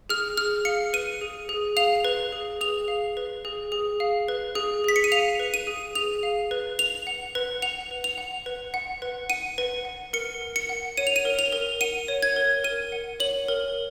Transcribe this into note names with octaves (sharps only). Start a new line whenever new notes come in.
G#4 F6
G#4 F6
F5 C#7
B4 D#7
G#4
G#4
F5 F7
B4
G#4
G#4 F7
F5
B4
G#4
G#4
F5
B4
G#4
G#4 B6
C#7
D#7
F5 F7
B4
D#7
G#4
G#4 F7
F5
B4
B4 F7
F#5
B4
F#5 F7
B4
F7
F#5
B4
F#5
B4
F#5 D#7
B4
F#5
A#4 C#7
A#4
C#7
F#5
C#5 D#7
F7
D#7
A#4
F7
A#4
F#5 D#7
C#5
G#6
A#4
A#4 D#7
F#5
C#5 F#7
A#4